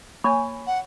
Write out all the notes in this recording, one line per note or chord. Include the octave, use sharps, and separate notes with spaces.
A#3 C#5 G#5 B5 C#6
F#5